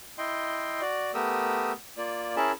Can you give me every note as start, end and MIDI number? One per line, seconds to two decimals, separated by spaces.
0.18 0.81 64
0.18 0.81 75
0.18 0.81 79
0.18 0.81 84
0.81 1.11 66
0.81 1.11 74
1.14 1.72 57
1.14 1.72 59
1.14 1.72 67
1.14 1.72 70
1.14 1.72 87
1.14 1.72 88
1.97 2.35 58
1.97 2.35 65
1.97 2.35 74
2.36 2.52 61
2.36 2.52 64
2.36 2.52 68
2.36 2.52 70
2.36 2.52 81
2.36 2.52 83